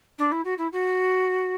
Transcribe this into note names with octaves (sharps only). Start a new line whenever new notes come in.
D4
E4
F#4
E4
F#4